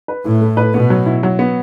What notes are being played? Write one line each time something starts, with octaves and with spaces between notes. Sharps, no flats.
B4
A2 E4
A3
B4
B2 B3
F#3
E4
F#3
B3